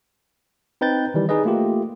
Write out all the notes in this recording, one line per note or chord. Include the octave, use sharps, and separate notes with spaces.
C4 D#4 B4 G5 G6 A6
D#3 E3 G3
D#4 G#4 B4 D#5
A3 A#3 F4 G4